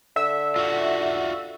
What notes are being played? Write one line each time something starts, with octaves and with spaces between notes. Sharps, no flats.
D3 E5
F4 F#4